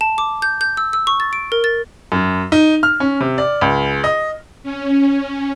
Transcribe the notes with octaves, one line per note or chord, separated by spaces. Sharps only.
A5
D6
G6
G6
E6
E6
C#6
A6
D7
A#4
A6
F#2
D#4
F6
C#4
C3
D5
C#2
D#5
C#4